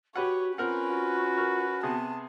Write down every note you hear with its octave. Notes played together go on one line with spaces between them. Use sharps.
F#4 G4 B4 C#5 F#5
C4 C#4 F4 A#4 B4 F#5
F#4
A#4
C3 B3 G#4 A5